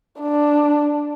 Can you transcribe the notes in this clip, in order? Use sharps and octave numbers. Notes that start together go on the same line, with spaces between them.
D4